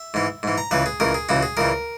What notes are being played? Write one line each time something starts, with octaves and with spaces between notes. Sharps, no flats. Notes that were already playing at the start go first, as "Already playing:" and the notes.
Already playing: E5
G#2 E3
G#2 E3
A#5
C#2 C#3 E3 B4
G#4
C#2 C#3 E3 A#4
G#4
C#2 C#3 E3 F#4
G#4
C#2 C#3 E3 A#4